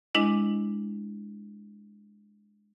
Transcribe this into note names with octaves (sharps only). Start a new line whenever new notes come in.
G#3 D4 E4 D#5